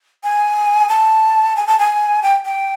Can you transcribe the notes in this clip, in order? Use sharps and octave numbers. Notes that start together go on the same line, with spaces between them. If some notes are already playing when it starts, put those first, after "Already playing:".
G#5
A5
G#5
A5
G#5
G5
G5